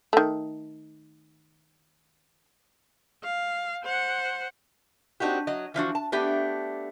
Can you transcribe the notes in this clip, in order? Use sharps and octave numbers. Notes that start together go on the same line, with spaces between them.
D#3 A3
F5
C5 F#5
C4 D4 D#4 F#4 G4
F#3 D#5
E3 F3 D4 F#4
A5
A3 B3 D4 G4